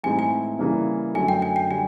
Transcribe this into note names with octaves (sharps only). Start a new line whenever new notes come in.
A2 E3 G#3 C4 D#4 G#5
G#5
C#3 E3 G3 A#3
F#2 D3 F#3 A3 G#5
G5
G#5
G5
D3 G3 G#5